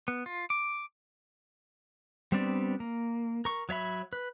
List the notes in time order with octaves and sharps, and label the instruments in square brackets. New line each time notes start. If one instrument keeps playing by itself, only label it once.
[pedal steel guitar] B3
F4
D6
G3 B3 C4 D4 D5
A#3
A#4 C#6
F#3 C#5 E5 B5
B4